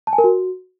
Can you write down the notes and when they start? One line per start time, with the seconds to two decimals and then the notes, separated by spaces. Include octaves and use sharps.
0.07 A5
0.13 G#5
0.18 A#4
0.24 F#4